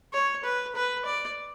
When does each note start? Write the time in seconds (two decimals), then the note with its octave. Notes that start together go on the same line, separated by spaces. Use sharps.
0.13 C#5
0.44 B4
0.75 B4
1.05 D5